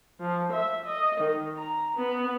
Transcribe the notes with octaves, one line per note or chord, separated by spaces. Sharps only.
F3
E5
D#5
D#3
A#5
B3